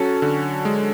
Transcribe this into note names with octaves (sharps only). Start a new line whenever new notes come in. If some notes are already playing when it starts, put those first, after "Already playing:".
Already playing: F#3 C#4 F#4 A4
D3
G#3